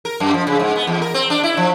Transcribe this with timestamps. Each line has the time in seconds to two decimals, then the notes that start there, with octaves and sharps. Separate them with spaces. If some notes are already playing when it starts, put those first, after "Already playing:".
0.05 A#4
0.20 F#2
0.34 F3
0.47 C#3
0.59 G#2
0.76 B3
0.87 E2
1.02 A#4
1.14 C4
1.30 D4
1.43 E4
1.57 F3